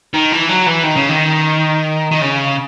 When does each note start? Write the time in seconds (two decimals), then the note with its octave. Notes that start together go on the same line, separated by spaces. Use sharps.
0.14 D#3
0.32 E3
0.49 F#3
0.66 E3
0.83 D#3
0.96 C#3
1.09 D#3
2.11 D#3
2.21 C#3